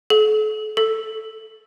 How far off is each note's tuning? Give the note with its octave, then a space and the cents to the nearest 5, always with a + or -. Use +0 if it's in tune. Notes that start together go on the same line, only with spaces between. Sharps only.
A4 -40
A4 +5